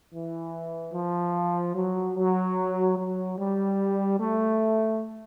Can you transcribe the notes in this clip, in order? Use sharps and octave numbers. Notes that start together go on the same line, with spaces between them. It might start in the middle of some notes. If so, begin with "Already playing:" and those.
E3
F3
F#3
F#3
F#3
G3
A3